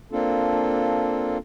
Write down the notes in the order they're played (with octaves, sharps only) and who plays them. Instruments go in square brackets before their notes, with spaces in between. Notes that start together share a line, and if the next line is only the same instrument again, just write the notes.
[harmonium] A#3 C4 D4 F4 A4